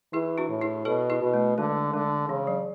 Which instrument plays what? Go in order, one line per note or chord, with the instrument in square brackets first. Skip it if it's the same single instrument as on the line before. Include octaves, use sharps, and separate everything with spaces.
[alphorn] E3 [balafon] E4 G#4
[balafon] D4 F#4
[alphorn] A2
[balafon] E4 G#4
[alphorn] B2 [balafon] F#4 A4
[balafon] E4 G#4
[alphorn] B2
[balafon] A3
[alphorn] D3 [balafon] G#3
[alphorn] D3 [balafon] G#3
[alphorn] C#3 [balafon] E3
[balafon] F#3